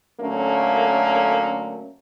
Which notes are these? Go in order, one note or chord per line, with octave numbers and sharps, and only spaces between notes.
D3 F#3 A3 A#3 C#4